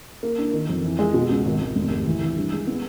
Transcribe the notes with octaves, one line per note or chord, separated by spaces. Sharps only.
A#3
D4
D#3
F2
E3
G#3
B2
C#2
G#1
G#1
F1
D#2
E3
E3
G2
G#3
B3